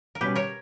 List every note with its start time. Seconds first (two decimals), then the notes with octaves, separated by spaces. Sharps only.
0.15 A#4
0.21 B2 G3 C#4 G4 B4
0.35 A#4 C#5